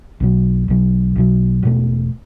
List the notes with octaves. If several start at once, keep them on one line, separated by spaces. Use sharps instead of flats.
B1 B2 F#3
B1 B2 F#3
B1 B2 F#3
E1 E2 B2 A3